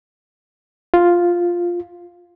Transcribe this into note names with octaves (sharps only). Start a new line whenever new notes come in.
F4